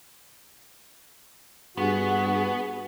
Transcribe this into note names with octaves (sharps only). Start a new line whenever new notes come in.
G2 B3 F#4 G#4